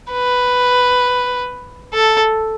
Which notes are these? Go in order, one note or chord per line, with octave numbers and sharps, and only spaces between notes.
B4
A4